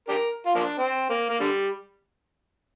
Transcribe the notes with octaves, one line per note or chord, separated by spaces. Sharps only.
D4 G4 A#4
F4
F3 A#3 D4
C4
A#3
A#3
D3 G3